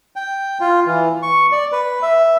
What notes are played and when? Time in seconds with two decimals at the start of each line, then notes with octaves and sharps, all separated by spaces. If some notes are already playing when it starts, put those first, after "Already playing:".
0.16 G5
0.60 F4
0.86 E3
1.23 C#6
1.52 D5
1.72 B4
2.02 E5